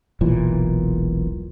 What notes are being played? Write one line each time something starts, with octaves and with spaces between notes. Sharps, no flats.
E1 B1 A#2 E3